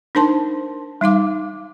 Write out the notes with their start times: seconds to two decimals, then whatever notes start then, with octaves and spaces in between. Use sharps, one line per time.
0.15 D4 D#4 A#4 C5 A5 C6
1.01 G3 D#4 F5 D6